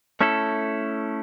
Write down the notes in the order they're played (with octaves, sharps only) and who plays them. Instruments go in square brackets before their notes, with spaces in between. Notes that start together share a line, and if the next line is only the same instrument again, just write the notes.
[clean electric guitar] A3 C#4 E4 A4